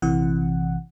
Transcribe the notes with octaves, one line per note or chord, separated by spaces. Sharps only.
A#1 C3 E3 F#5